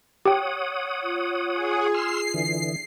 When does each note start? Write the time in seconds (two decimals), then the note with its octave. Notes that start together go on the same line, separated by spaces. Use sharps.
0.25 G4 C#5 F#5 G5 D#6
1.03 F4
1.53 G#4
1.94 C6 E6 F6 C7
2.34 D3 E3